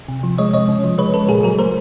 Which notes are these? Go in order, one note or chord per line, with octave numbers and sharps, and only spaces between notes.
C3
F3
G#3 C#5 D#5
C3 C#5 D#5
C#3
F3
G#3 B4 C#5
C#3 A4 B4
A#2 G#4 A#4
F#3 G#4 A#4
A3 A#4 C5